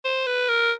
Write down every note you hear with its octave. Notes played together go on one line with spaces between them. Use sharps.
C5
B4
A#4